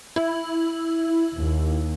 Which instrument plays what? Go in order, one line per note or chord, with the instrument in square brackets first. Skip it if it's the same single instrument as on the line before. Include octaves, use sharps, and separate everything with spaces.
[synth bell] E4
[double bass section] D#2